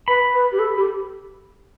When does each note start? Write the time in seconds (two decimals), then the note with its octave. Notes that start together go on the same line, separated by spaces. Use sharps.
0.08 B4 B5
0.34 B4
0.52 G4
0.59 A4
0.77 G4